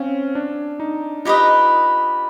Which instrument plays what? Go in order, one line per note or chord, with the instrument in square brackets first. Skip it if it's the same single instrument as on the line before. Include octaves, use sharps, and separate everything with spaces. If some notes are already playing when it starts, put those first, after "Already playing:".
Already playing: [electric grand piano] C4 C#4 [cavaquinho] F5
[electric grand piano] D4
D#4
[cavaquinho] D#4 G4 B4 D#5 [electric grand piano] F4